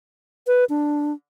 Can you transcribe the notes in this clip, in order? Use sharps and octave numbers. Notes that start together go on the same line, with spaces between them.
B4
D4